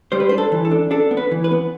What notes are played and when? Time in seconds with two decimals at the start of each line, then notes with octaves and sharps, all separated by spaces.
0.12 G3 C5
0.20 B4
0.29 D4 C5
0.38 A4
0.52 E3
0.65 A4
0.71 D4
0.91 D4 A4
1.11 B3
1.17 B4
1.31 E3
1.44 B4
1.51 B3